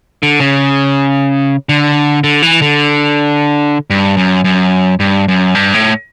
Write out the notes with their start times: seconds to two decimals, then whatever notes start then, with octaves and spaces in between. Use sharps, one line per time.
0.23 D3
0.40 C#3
1.69 D3
2.24 D3
2.42 E3
2.62 D3
3.90 G2
4.17 F#2
4.44 F#2
5.00 G2
5.28 F#2
5.55 G2
5.74 A2